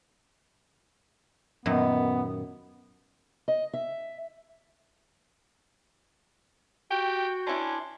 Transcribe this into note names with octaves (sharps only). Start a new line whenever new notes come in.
F#2 A#2 D#3 B3
D#5
E5
F#4 G4 G5
C#4 D4 E4 C6